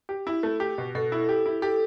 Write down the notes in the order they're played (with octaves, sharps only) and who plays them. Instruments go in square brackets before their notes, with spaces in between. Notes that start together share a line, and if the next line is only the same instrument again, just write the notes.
[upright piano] G4
E4
A3
G4
B2
[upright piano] B2 [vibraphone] A4
[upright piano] E4
G4
E4
[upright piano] G4 [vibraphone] A4